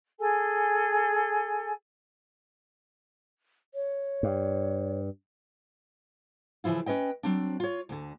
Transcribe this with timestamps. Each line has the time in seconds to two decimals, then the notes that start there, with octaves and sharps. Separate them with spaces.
0.18 G#4 A4 G#5
3.75 C#5
4.23 G2
6.64 C#3 E3 F3 E4 F4
6.86 C#4 B4 D#5 G5
7.23 F#3 C4 D4
7.60 F4 C#5
7.89 D2 D3